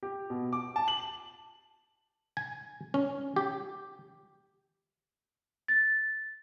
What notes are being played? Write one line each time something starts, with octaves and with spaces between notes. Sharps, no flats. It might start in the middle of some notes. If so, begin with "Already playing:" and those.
G4
B2
D6
A5
F#7
G#5
C#4
G4
A6